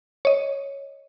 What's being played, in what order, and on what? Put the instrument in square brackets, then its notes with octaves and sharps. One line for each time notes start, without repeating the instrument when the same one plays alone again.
[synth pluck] C#5 D#5